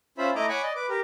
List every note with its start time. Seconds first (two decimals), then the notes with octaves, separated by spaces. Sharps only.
0.18 C#4 F4 C5 E5 B5
0.35 A3 E4 D#5 A#5 D6
0.49 C#5 F#5 G#5 B5 C#6 D6
0.63 D5 D#5
0.76 B4 D6
0.89 G4 A#4